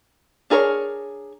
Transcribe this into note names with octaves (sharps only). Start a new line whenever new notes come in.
D4 G#4 A#4 C5 C#5